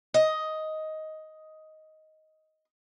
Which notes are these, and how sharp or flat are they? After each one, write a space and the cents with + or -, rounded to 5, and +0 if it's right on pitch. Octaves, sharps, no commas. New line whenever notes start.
D#5 +10